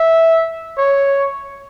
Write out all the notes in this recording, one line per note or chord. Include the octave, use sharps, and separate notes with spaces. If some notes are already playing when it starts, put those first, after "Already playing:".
Already playing: E5
C#5